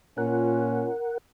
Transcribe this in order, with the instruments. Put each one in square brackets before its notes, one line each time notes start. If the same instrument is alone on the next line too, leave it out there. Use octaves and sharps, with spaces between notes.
[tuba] A#2 [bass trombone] C#4 [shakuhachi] F4 [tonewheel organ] A#4 F#5